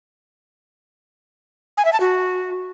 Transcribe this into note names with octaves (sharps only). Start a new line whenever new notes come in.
G#5
E5
A5
F#4